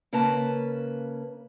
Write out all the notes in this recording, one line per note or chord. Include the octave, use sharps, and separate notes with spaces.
C#3 A#3 C#4 B4 A5